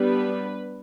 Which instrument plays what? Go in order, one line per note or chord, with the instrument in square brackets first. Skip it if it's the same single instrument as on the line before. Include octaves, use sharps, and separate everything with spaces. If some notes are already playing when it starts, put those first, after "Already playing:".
Already playing: [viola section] G3 B3 D4 B4